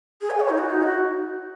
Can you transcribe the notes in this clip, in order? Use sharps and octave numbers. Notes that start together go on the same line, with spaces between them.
G#4
G#5
C#5
D#4
F#4
D#4
F#4